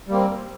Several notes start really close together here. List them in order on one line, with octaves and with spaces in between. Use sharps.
G3 A#3 C4